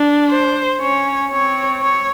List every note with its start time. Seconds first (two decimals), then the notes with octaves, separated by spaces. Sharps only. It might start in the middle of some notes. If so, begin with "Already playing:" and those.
Already playing: D4
0.30 C5
0.81 C#4 C#5
1.31 C4 C#5
1.82 C#5